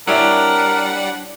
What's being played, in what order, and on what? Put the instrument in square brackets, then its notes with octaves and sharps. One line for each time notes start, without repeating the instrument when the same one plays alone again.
[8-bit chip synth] G3 F#5 [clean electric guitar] D4 C#5 [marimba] E4 D5 E5 [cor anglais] A#4